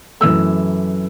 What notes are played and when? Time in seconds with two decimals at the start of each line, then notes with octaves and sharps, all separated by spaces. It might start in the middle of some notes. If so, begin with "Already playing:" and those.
0.20 F#2 E3 A3 E6